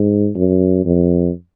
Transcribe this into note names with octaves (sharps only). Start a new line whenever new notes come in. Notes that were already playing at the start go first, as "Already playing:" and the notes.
Already playing: G#2
F#2
F2